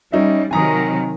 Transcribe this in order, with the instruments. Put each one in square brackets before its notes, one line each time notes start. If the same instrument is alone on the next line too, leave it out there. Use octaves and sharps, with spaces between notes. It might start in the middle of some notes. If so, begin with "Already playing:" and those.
[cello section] G3 [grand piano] C#4 D#4 E5
[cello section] C3 D#3 F#3 [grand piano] G#5 A#5 D#6